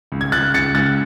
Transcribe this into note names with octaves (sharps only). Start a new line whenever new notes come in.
C#2
G#6
C#2 F#6 A6
C#2 A6 C#7
C#2 F#6 A6